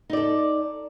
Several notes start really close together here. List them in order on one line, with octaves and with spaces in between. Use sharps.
D#4 D5 A4